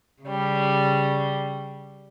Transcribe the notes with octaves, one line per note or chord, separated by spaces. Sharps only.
C#3 G3